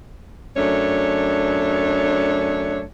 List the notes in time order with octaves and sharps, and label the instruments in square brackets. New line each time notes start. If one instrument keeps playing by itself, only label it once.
[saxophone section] F#2 A3 D4 C#5